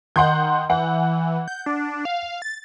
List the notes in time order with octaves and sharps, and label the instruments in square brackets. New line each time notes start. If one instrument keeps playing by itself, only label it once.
[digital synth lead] D#3 [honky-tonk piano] F#5 C6 G6
[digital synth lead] E3 [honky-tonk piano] F#5
[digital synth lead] G6
D4
F5
A6